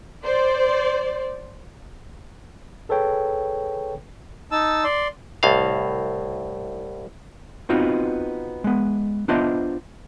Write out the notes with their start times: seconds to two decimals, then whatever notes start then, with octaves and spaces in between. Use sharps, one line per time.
0.25 C5 D5
2.89 G#4 A4 B4 C#5 G5
4.51 D#4 A5 E6
4.84 D5 C6
5.43 C2 A2 F5
7.69 B3 C4 D#4 F4 F#4
8.64 G#3 B3
9.28 B3 D4 F4 C5 D#5 E5